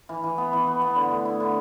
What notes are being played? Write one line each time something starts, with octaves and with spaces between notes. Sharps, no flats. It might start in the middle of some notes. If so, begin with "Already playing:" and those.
E3
E3
B3
E3
B3
B3
D3
A3
E4
D3